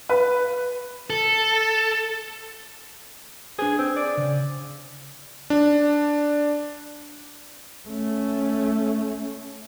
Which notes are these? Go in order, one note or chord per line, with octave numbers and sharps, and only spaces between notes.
B4
A4
D4 G#4 B4 C5
C4
D5
C#3
D4
A3 C#4